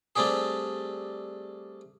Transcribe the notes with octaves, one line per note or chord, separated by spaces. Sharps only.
G3 A3 C4 D4 G4 G#4